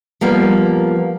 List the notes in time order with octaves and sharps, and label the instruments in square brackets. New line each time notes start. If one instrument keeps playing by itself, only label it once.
[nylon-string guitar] F3 G3 A#3 B3